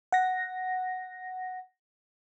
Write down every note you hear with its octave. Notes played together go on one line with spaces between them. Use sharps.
F#5 A#6